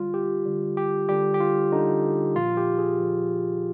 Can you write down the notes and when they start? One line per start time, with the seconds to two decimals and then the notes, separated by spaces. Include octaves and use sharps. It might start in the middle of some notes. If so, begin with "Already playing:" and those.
Already playing: D3 G3 F4
0.14 G4
0.45 D3 G3
0.77 G4
1.08 D3 G3 G4
1.34 G4
1.40 F4
1.72 D3 G3 D#4
2.36 A#2 F3 F4
2.57 G4
2.78 G#4
2.99 A#2 F3